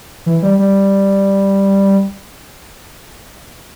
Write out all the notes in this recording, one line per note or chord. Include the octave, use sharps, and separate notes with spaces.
E3
G3
G3